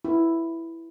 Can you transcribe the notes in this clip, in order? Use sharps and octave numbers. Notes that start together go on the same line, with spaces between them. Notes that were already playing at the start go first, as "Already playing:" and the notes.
E4